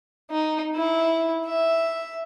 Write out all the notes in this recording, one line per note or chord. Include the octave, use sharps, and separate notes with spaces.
D#4
E4
E5